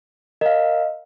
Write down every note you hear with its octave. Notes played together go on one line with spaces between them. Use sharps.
A#4 D#5 F5